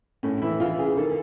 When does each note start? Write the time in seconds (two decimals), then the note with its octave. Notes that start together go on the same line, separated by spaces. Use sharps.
0.23 A2 C#4
0.42 E3 E4
0.60 E3 F4
0.79 C#3 G#4
0.97 D#3 A4